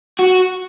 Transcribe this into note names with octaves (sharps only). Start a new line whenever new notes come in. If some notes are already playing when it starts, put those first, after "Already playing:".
F#4